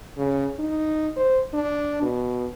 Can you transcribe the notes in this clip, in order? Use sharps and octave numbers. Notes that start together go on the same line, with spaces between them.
C#3
D#4
C5
D4
B2